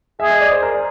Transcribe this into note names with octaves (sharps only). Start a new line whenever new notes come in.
G#4 E5
D#5
D5
C5
A#4